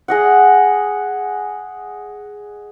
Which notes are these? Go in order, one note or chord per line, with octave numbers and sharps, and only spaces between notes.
G#4 D#5 F#5